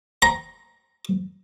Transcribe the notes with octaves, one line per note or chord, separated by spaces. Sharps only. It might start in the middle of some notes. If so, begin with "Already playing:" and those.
A#5